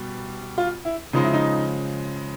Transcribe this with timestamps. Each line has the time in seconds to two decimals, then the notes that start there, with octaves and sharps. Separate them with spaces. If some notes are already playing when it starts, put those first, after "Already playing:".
Already playing: B2 G3
0.58 F4
0.85 E4
1.13 C#3 F3 G#3 D#4
1.24 E4
1.34 D#4